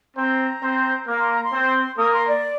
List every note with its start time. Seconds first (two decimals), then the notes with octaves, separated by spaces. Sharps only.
0.16 C4 C5 A#5
0.61 C4 C5
1.07 A#3 A#4 D6
1.19 C6
1.31 A#5
1.44 C6
1.52 C4 C5
1.97 A#3 A#4 D#6
2.13 C6
2.28 D5